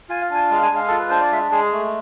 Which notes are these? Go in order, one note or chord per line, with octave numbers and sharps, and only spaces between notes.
F4 G#5
F5
D4 G#5
G#3 F5
G#5
G#3 F5
F4 A4
B4
D4 C5
D5
G#3 E5
G#3 G#4
A3